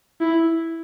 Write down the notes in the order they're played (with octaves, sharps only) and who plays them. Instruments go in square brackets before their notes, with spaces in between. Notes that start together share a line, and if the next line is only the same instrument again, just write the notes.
[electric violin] E4